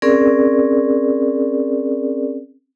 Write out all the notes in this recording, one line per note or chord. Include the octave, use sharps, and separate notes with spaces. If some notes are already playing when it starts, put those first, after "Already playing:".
C4 C#4 G#4 A#4 D5